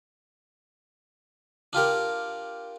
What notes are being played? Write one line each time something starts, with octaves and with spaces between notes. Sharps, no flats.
D4 F4 G4 A#4